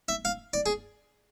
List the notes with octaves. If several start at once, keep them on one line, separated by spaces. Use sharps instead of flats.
E5
F5
D5
G#4